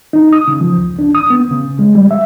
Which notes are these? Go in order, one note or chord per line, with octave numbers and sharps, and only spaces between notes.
D#4
D#6
C#3
F3
C#2
D4
D#6
B3
C#3
G#3
G3
E5